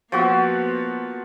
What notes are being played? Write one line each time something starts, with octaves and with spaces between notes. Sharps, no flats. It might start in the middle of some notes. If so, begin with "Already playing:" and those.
F3 A#3 B3 F#4 E6